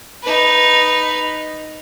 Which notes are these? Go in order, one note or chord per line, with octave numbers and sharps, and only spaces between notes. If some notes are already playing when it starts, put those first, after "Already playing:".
D#4 B4